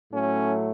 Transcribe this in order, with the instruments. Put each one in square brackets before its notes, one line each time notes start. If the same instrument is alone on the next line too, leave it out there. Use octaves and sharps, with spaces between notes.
[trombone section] A2 F#3 A3 C#4